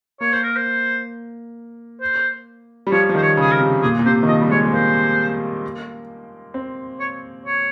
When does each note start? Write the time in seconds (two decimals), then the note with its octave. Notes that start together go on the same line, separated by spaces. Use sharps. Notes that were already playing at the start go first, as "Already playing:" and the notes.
0.21 A#3 C#5
0.33 C5
0.43 A#4
0.56 C5
2.01 C5
2.87 G3
2.92 F3 C#5
3.09 F3
3.15 D#3 C5
3.22 C#5
3.37 C#3 G#4
3.52 A#4
3.60 C3
3.82 A#2 G#4
3.99 A#2
4.06 C3 C5
4.23 D#3
4.28 F3 D#5
4.41 G3
4.50 G#3 C#5
4.65 G#3
4.73 A#3 C5
6.54 C4
7.00 C#5
7.45 C#5